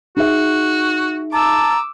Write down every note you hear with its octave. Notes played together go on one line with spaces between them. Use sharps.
D#4 F#4 G#4 E5
A5 A#5 D6 E6